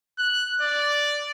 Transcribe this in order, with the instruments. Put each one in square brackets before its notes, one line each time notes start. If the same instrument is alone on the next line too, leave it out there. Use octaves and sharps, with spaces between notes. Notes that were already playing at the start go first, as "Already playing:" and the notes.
[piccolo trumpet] F#6
D5